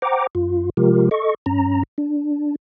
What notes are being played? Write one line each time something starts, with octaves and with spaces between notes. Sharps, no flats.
C5 F#5 G5 A#5 D6
F#2 F4
C3 F3 G#3 F4 G4 A#4
A4 D#5 C#6
G2 C#4 A#5
D4